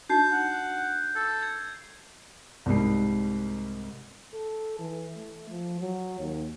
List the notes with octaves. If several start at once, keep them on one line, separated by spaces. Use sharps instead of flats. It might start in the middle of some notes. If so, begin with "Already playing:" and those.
D4 D#4 F#4 G6 C7
F#5
A4
G#6
C2 G#2 G3 C7
A4
E3
A3
F3
F#3
D#2